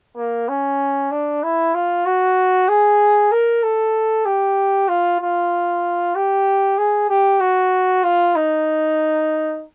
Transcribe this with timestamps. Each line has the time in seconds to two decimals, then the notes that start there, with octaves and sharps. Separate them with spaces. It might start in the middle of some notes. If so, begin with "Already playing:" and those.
0.16 A#3
0.49 C#4
1.11 D4
1.43 E4
1.74 F4
2.06 F#4
2.68 G#4
3.32 A#4
3.63 A4
4.25 G4
4.89 F4
5.21 F4
6.15 G4
6.78 G#4
7.10 G4
7.40 F#4
8.04 F4
8.36 D#4